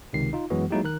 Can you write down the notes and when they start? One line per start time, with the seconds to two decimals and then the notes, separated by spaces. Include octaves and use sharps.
0.13 C#2 C3 D#3 C7
0.33 D#4 F4
0.50 F#2 E3 F#3 G#3 B3 F#4
0.71 F#3 G#3 A#3 D#4 E4 G4
0.84 D#3 A#4 F#6